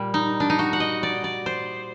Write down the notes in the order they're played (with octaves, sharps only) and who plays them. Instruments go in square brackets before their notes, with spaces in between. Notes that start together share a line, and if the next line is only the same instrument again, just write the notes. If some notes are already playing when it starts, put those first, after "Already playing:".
Already playing: [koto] A#2 G3
D#4
D4
D#4
F#4
F#5
D#5
D5
D5
C5